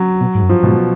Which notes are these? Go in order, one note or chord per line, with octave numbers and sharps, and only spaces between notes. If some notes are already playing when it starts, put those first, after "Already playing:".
Already playing: F#3
B2
G#2
F#2
G2 F3
G#2 B2